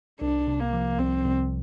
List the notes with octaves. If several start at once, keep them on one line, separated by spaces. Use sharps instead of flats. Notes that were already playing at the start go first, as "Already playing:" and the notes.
C2 D4
C3
A#3
F3
C2 C4
C2